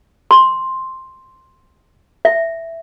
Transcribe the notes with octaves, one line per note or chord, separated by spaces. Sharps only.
C6
E5